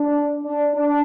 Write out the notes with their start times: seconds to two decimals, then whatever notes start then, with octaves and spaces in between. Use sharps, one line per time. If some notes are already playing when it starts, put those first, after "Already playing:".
Already playing: D4
0.43 D4
0.74 D4